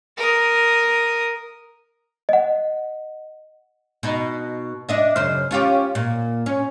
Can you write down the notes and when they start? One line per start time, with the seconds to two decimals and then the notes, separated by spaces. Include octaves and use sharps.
0.18 A#4 D#6
2.29 D#5 F#5
4.03 B2 D#4
4.89 D4 D#5 E5
5.16 F#2 C#3 C5
5.51 C#4 F4 G4
5.95 A#2
6.46 C#4